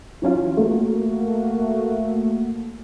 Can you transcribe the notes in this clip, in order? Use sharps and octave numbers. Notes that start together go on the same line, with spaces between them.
E3 F#3 C#4 F4
A3 A#3 F#4